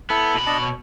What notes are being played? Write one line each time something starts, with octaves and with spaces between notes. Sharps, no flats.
B3 E4 A4
B2 B5
D4 D#5 A5
C#5